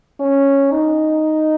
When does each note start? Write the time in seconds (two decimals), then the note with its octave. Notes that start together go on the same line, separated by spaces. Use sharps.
0.20 C#4
0.72 D#4